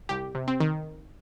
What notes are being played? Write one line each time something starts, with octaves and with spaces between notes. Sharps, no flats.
C2 G4
C3
C4
D#3